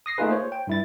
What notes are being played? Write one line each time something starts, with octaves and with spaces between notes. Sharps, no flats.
D#6 A#6 C7
A3 A#3 D#4 F4 G#4 B4
C5 C#5
G5
G2 E4 A6